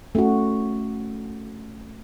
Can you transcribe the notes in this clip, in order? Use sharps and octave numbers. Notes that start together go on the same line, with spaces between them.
A3 C#4 F#4